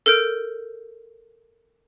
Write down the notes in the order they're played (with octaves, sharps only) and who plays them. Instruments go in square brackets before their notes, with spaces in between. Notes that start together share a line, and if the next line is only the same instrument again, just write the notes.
[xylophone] A4 A#4 F6 G6 D7